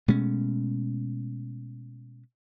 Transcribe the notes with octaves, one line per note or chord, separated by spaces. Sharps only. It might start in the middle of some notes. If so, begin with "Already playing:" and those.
B2 G#3 A3 C#4